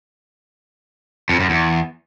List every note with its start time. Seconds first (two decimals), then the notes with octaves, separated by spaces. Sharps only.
1.29 F2
1.40 F#2
1.50 E2